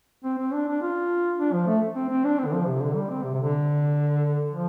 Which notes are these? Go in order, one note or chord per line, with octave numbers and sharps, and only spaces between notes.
C4
C4
D4
D4
F4
D4
F3
A3
C4
C4
D4
C4
D3
F3
C3
D3
G3
C4
C3
C3
D3
F3